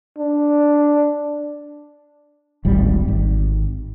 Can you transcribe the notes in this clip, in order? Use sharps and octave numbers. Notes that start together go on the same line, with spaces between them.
D4
D1 G#1 G3
G#1